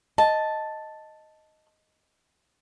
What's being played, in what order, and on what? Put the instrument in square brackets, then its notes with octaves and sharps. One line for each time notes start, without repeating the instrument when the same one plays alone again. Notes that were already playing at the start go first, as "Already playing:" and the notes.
[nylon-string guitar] D#5 [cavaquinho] A5